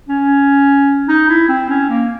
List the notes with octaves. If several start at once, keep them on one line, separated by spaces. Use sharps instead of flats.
C#4
D#4
E4
C4
C#4
A#3